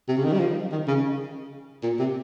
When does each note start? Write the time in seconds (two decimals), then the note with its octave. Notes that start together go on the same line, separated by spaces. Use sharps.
0.08 C3
0.17 C#3
0.24 D#3
0.33 G3
0.40 F3
0.72 D#3
0.88 C#3
1.83 A#2
1.99 C3